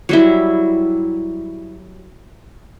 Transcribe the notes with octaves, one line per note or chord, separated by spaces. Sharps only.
F#3 G3 E4